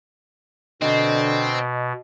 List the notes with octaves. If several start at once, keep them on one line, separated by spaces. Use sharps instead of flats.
B2 D3 C4 D#5